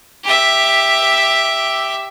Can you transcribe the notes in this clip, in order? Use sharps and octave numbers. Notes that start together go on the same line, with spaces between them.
G4 E5